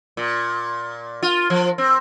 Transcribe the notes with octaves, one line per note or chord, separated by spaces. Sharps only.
A#2
F4
F3
C4